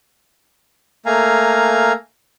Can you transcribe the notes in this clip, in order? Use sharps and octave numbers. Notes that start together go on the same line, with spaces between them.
A3 A#3 F5 G#5 A#5